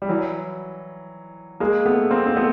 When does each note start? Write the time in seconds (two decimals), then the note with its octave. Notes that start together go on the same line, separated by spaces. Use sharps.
0.02 G3
0.09 E3 F#3
1.60 G#3 A#3
1.85 A3 B3
2.11 A#3 C4
2.27 C4
2.36 A3 B3